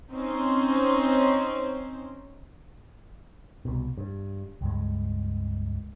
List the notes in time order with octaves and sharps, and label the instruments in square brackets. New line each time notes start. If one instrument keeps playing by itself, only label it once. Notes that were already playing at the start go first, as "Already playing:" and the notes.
[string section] C4 C#4 D#4 C5
[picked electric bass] C2 B2
G2
C#2 G2 G#3